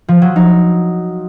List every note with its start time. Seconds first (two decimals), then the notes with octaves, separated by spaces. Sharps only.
0.08 F3
0.22 F#3
0.36 D#4